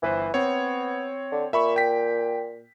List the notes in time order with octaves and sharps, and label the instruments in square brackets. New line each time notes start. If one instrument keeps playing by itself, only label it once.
[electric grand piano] G1 B4 C5 [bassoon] E3
[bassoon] B3 [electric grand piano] C4 C#5
[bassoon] D3
[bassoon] A#2 [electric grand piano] E5 B5 C#6
[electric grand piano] G5 B6